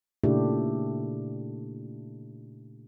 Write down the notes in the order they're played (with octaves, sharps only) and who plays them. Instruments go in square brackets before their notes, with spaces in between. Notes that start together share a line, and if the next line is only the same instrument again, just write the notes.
[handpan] A#2 C#3 A3 D4 E4 G4